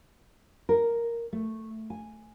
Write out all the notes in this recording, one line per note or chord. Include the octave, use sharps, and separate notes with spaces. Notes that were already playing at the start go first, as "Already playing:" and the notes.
A#4
A3
G#5